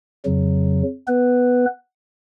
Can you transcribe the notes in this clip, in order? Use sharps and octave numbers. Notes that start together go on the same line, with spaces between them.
F2 C#3 F#3
B3 B4